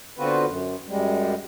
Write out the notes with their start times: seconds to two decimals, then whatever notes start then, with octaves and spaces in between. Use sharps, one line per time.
0.18 D3 B3 C4 F4 F#4 B4
0.46 F#2
0.88 F#2 G3 G#3